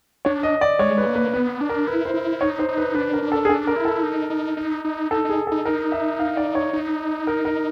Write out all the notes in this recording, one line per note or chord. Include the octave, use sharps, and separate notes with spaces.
D4 C#5
D#5
D5
G#3 C#5
B4
A#3
B4
B3 B4
D4
A#4
E4 B4
C5
E4
D#4 C#5
C5
D#4
B4
D4 B4
A#4
D4
A4
G#4
D4 A4
A#4
E4
A4
D#4
D#4
D#4
D#4
D#4 A4
D#4 G#4
A4
D#4
D#4 A#4
E5
F5
D5
C#5
D#4
A#4
A#4